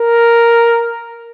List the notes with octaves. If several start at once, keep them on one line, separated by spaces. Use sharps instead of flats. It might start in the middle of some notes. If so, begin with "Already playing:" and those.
Already playing: A#4